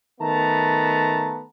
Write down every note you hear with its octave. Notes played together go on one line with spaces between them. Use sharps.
D#3 A3 B3 A5 A#5